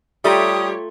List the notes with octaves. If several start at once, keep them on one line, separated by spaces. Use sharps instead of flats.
G3 A3 F4 G4 C#5 A#5 D#6